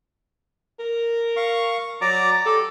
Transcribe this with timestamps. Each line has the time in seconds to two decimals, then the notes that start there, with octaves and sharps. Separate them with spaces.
0.80 A#4
1.36 F5 C#6
2.01 F#3 D5 A#5 D6
2.46 G4 A4